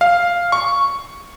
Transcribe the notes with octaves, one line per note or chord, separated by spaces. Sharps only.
F5
C#6